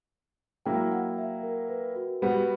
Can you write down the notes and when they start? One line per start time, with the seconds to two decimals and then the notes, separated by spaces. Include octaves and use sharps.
0.66 F#3 A#3 E4 G5
0.92 F#5
1.18 E5
1.43 A#4
1.69 B4
1.96 F#4
2.21 G3 B3 F#4 G4